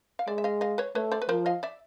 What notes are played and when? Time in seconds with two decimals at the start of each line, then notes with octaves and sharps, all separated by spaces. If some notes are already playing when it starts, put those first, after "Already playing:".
0.19 F5
0.27 G#3 D5 E5
0.38 E5
0.44 D#5 F5
0.61 D#5 F5
0.78 B4 C#5
0.95 A3 B4 C#5
1.12 C5 D5
1.22 B4
1.29 F3 A#4 C5
1.46 D#5 F5
1.63 D5 E5